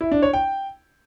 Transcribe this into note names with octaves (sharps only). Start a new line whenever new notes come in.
E4
D4
C#5
G5